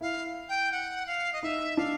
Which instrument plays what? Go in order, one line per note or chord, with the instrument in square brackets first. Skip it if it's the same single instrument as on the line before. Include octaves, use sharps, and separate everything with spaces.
[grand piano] E4 [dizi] F5
[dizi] G5
F#5
F5
D#5
[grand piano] D#4 [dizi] E5
[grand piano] D4 [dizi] F5